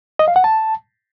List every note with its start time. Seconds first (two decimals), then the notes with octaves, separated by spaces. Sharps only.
0.19 D#5
0.28 F5
0.36 F#5
0.44 A5